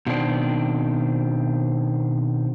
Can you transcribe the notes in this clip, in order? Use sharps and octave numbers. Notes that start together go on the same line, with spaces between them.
B2 D#3 C4 D4